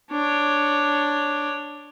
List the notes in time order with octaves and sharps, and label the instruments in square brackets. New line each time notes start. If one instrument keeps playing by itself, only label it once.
[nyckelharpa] D4 C#5